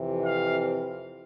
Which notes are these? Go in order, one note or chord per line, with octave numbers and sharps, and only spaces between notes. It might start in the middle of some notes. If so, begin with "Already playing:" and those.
Already playing: F2 C3 E3
F5